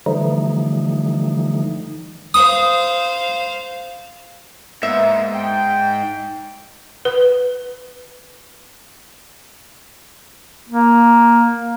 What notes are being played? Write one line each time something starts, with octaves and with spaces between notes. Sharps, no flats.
D3 E3 F3 G3 A3 D#4
C5 F5 D#6
G#2 A#3 B3 E5
G5
B4
A#3